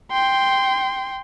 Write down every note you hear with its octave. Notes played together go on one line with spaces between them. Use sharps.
G5 C6